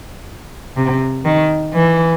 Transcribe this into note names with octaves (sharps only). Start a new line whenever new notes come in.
C3
D#3
E3